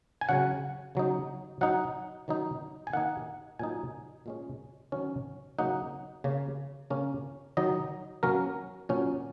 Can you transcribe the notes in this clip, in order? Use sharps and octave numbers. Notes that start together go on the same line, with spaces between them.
G#5
C#3 F#3 C#4 F#5
C#3 F#3 D#4
F#3 D#4 F#5
D#3 F#3 D#4
G#5
D#3 A#3 D#4 F#5
A#2 F#3 D#4 G#5
A#2 G#3 C#4
D#3 F#3 C#4
C#3 F#3 A#3 D#4 F#5
C#3 A#3 C#4
C#3 A#3 C#4
D#3 F#3 D#4 D#5
F#3 A#3 C#4 A#4
A#2 F#3 C#4